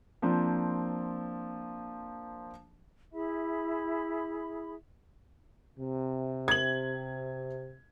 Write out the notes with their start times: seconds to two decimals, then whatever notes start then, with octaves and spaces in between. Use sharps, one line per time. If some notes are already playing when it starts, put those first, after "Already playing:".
0.22 F3 A#3 C4 D4
3.12 E4 G#4 E5 B5
5.78 C3
6.48 G#6 F#7